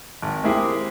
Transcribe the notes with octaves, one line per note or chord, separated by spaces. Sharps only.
G#1
G#3 A#3 C4 E4 G4 G#4